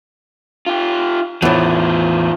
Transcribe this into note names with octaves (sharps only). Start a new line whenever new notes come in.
F4 G4
E2 A2 D#3 F3